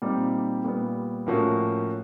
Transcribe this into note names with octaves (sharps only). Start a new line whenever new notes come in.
A#2 G3 C4 D#4 G4
A#2 G3 B3
A2 F3 A#3 C#4 F#4